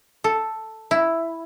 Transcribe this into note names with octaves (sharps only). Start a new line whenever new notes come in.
A4
E4